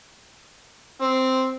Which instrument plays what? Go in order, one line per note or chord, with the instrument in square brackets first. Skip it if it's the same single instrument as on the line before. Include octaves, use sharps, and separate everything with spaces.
[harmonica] C4